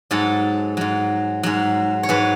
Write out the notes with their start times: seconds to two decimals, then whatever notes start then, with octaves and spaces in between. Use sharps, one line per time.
0.11 G#2 F#3 A4
0.77 G#2 F#3
1.43 G#2 F#3
2.03 C#5
2.09 G#2 F#3 B4